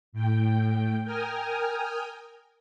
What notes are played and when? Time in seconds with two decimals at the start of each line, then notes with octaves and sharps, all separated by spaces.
0.12 A2 G5
1.04 A#4 G5 G#5 D#6 F6